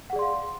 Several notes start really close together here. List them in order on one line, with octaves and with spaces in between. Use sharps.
F#5 G#4 D5 C6 F5